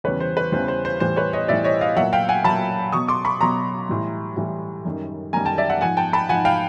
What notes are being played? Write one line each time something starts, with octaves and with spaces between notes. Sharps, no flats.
E2 C#3 E3 G3 B4 C#5
C5
B4
E2 C#3 E3 G3 C5
C5
C5
A2 E3 G3 C5
B4 C#5
C#5 D#5
A2 E3 G3 D5 E5
C#5 D#5
D#5 F5
A#2 F#3 E5 F#5
F5 G5
F#5 G#5
A#2 F#3 A5 B5
B2 F#3 C#6 D#6
C6 D6
B5 C#6
B2 F#3 A#5 C6
A2 E3 G3
A2 E3 G3
F#2 D#3 G3
F#2 D#3 G3 G#5 A#5
G5 A5
D5 E5
E5 F#5
G#2 F3 F#5 G#5
G5 A5
A5 B5
G#2 F3 F#5 G#5
F5 G5